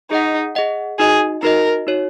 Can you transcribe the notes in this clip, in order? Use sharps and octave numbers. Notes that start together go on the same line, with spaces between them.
D#4 G#4 D#5 F#5
G#4 D#5 F#5
D#4 F#4 G#4 D#5
D#4 F#4 A#4 D#5
D#4 F#4 C#5